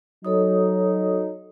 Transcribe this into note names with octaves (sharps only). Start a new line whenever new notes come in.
F#3 D#4 A4 C#5 D#6